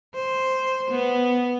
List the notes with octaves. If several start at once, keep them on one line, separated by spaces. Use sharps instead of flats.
C5
B3